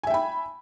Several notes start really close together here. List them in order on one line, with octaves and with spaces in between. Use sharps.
G#5 E5 G5 B5